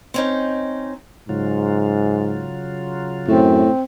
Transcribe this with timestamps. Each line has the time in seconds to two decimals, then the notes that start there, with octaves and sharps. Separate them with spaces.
0.14 C4 C#4 D#4
1.29 G#2 C#3 F#3 F4
3.28 F#2 A2 C4